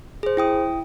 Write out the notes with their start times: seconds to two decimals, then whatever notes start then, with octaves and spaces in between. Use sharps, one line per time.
0.23 G#4 C5
0.37 E4 G5 D#6